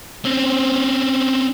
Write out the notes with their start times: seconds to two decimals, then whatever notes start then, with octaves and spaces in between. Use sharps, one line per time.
0.25 C4 C#4